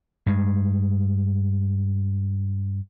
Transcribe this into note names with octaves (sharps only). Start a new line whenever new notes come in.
G2 G#3